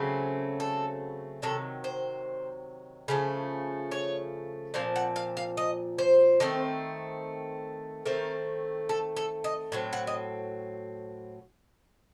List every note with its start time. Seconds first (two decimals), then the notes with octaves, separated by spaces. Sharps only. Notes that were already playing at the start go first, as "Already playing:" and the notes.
Already playing: C#3 F#3 A3 C4
0.60 A4
1.42 C3 D#3 F#3 A4
1.84 C5
3.08 C#3 F3 A3
3.91 C#5
4.74 A#2 F3 C4 F5
4.96 F#5
5.16 F5
5.37 F5
5.57 D#5
5.98 C5
6.40 D#3 A3 C4
8.06 D#3 A3 C4 A#4
8.89 A4
9.17 A4
9.44 D#5
9.72 A2 F#3 C4
9.93 F#5
10.07 D#5